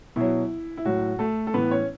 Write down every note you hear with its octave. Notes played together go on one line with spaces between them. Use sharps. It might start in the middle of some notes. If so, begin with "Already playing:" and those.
B2 F#3 E4
E4
A2 F#3 F#4
A3 A4
A4
A2 E3 B3 B4
C#4 C#5